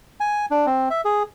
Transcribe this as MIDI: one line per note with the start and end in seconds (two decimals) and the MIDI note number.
0.20 0.46 80
0.51 0.66 62
0.66 0.89 60
0.90 1.01 76
1.05 1.23 68